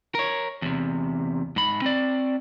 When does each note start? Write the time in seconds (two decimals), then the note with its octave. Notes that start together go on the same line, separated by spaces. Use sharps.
0.15 A#4 C#5
0.62 E2 C3
1.56 G#2 B5
1.82 C4 D5